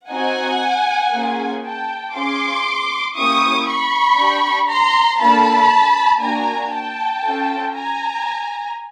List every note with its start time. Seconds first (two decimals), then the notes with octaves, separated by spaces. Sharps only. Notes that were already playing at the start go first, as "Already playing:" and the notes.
0.10 C4 D#4 F#4 F#5 G#5
1.12 A#3 C#4 F4 G#4
1.63 G5 A5
2.14 C#4 F4 G#4 C6 D6
3.15 A#3 C#4 E4 G4 C#6 D#6
3.66 B5 C#6
4.17 D4 G4
4.68 A#5 C6
5.19 A#3 D4 F4 A4 A5 B5
6.20 A#3 D4 F#4 G#5 A#5
6.71 G5 A5
7.22 C#4 F4 A4
7.74 G#5 A#5